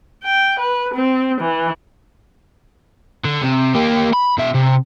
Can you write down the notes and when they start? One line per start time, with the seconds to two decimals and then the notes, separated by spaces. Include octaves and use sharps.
0.24 G5
0.60 B4
0.94 C4
1.41 E3
3.24 D3
3.42 C3
3.75 A#3 G4
4.13 B5
4.38 B2 E5
4.54 C3